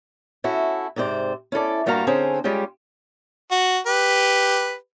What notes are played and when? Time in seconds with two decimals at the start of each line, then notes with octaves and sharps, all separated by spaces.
0.44 C#4 E4 F#4 A4
0.96 G#2 C3 C4 C5 D5
1.52 C#4 E4 A4 D5
1.86 G2 G3 A#3 F#4 F5 A#5
2.07 D3 C4 C#4 G#4 C5 A#5
2.44 G3 G#3 C#4 F4 G4
3.51 F#4
3.87 G4 B4